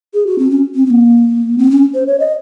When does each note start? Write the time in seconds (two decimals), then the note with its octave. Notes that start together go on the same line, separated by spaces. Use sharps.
0.14 G#4
0.27 F#4
0.39 C4
0.51 C#4
0.75 C4
0.86 C4
0.90 A#3
1.58 C4
1.71 C#4
1.95 C5
2.07 C#5
2.20 D#5